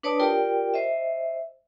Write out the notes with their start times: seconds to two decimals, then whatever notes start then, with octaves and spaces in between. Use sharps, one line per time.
0.03 D4 B4 C#5 D5 A5 D#6
0.20 F4 G4 A#4 D5 G5
0.74 C5 D#5 E5